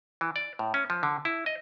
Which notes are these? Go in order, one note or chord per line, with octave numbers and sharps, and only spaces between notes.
E3
D5
A2
C#4
F3
D3
E4
D#5